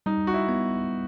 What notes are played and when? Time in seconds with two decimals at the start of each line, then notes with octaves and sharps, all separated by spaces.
0.06 G3 D#4
0.27 F#4
0.34 E4
0.49 B3